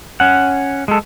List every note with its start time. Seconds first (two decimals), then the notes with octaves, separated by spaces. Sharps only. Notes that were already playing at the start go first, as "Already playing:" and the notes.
0.20 C#4 F#5
0.88 G#3 A4